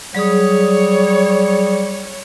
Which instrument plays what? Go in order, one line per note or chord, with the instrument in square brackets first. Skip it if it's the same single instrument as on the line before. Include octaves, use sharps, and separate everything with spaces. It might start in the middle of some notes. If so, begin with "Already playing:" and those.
[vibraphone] F#3 G#4 D#6 [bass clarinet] G3 [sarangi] C#5